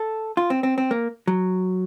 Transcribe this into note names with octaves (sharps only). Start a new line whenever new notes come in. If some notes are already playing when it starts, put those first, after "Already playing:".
Already playing: A4
F4
C4
C4
C4
A#3
F#3